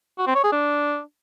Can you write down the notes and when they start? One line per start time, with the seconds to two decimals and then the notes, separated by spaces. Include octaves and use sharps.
0.18 F#4
0.27 C4
0.35 C#5
0.44 G#4
0.52 D4